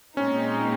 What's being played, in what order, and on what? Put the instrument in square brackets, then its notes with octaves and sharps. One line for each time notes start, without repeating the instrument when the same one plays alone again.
[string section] A#2 G#3 C4 D#4 [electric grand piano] C#4